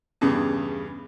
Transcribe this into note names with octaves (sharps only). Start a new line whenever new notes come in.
E2 G2 C#3